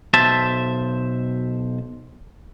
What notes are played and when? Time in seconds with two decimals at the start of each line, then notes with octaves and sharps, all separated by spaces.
0.13 B1 B2 C5 E5 A5